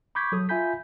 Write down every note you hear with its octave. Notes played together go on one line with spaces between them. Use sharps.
B5 C#6 D6 G6 G#6 B6
F#3 A4 D#6
F4 E5 G#5 B5 G6 B6